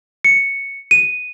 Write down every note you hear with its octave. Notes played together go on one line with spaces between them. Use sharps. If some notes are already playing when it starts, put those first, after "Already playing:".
C#7
D#7